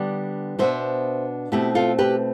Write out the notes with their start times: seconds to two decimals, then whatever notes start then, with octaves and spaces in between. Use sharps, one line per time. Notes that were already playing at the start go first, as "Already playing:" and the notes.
Already playing: D3 G3 B3 D4 D5
0.59 B2 B3 D4 C5 E5
1.52 B2 A3 C4 E4 G4
1.75 F4 A4
1.99 G4 B4